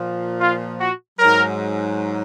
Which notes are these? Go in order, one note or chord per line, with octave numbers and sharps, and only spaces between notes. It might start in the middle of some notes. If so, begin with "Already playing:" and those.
Already playing: A#2 F3
F4
F#4
G#2 F#3 A#4